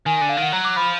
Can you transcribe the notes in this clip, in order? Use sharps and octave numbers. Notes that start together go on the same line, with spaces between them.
D#3 G#5
G#5
D3
F5
D#3 F#5
F#3 A#5
D6
F3 B5